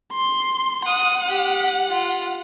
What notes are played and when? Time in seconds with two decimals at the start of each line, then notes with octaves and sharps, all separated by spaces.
0.13 C6
0.86 F#5 D#6
1.28 G4
1.89 F4